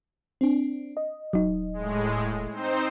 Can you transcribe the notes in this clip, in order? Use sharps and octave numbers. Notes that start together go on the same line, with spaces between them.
C4 D4
D#5
D#1 F#3 D#4
A2 G#3
C4 D#4 C5